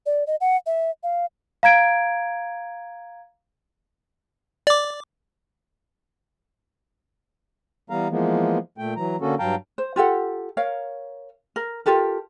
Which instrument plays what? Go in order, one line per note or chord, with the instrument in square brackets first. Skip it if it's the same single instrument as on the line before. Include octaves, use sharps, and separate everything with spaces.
[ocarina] D5
D#5
F#5
E5
F5
[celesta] F5 A#5 G#6 D7
[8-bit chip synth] D5 D6
[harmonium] E3 G3 B3 F5 A#5
E3 F3 G#3 A#3 B3
A#2 A3 G5
E3 F#3 A#5
D3 A#3 C#4 F#4 A4
G2 F#3 F5 G5 A5 A#5
[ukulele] C5
F4 G4 A4 F#5
A#4 C#5 F5
A#4
F4 G4 A4 A#4